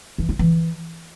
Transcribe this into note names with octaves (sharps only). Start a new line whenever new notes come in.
E3
F4
E3